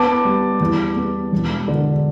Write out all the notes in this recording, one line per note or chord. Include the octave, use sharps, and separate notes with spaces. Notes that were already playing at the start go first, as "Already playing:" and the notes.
Already playing: B3 A5 D6
G3
E2
B3
E1
D3